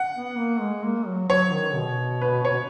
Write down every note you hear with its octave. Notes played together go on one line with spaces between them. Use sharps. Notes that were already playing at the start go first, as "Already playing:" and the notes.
Already playing: F#5
B3
A#3
G#3
A#3
F#3
F#3 C#5
D#3
B2
B4
C#5